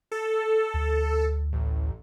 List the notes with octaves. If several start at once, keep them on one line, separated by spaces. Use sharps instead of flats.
A4
D2
A1